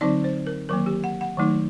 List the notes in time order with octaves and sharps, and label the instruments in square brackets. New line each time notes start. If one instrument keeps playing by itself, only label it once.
[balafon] D3 F#3 C4 D#4 D5
C5
A#4
D#3 F#3 A#3 A#4
G4
F#5
F#5
D#3 F#3 A3 D#4